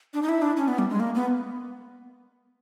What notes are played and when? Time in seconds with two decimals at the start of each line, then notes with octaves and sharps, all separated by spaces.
0.14 D4
0.22 D#4
0.29 E4
0.42 D4
0.57 C#4
0.68 B3
0.78 G3
0.90 G#3
1.00 A#3
1.15 B3